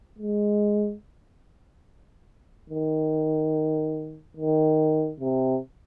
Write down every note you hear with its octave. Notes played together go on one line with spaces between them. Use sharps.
G#3
D#3
D#3
C3